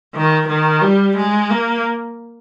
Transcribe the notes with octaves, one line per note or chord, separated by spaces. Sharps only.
D#3
D#3
G3
G#3
A#3